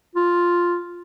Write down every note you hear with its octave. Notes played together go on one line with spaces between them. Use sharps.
F4